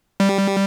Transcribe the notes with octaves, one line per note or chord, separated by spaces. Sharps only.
G3